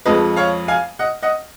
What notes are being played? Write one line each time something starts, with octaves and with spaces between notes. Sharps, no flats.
F2 F3 G#3 B4 D#5
C#5 F5
F5 G#5
D#5 F#5
D#5 F#5